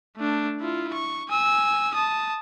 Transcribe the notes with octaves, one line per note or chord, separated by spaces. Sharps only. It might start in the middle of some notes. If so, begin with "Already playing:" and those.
A3 D4
E4 F4
C#6
G#5 E6
A5 D#6